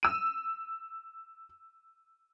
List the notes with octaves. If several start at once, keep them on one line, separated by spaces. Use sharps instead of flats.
E6 D#7